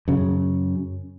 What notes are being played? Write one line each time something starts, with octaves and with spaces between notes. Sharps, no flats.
F#2 C#3